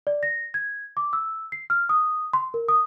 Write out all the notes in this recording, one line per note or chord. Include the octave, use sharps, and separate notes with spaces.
D5
A#6
G#6
D6
E6
C7
F6
D#6
C6
A#4
D#6